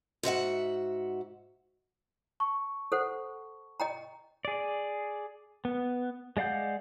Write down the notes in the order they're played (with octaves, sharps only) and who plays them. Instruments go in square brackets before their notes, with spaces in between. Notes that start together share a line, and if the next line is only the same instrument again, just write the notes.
[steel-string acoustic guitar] G#2 F#4 E5 F#5
[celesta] A5 C#6
[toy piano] A4 C5 F#5
D#5 G5 A#5
[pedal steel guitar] G#4 D5
B3
G#3 D5 F5 F#5 G6